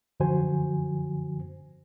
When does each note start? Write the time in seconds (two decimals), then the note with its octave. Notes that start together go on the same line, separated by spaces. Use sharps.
0.20 F#2 D3 F3 F#4 C5 G#5